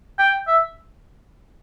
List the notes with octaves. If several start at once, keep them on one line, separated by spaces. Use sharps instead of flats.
G5
E5